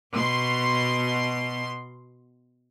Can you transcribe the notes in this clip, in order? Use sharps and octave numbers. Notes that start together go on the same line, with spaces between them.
B2 C6